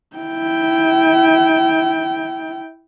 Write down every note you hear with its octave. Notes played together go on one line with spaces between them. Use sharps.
E4 G5